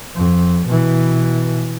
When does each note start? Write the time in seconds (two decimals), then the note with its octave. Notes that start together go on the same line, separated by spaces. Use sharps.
0.15 F2
0.67 B2 E3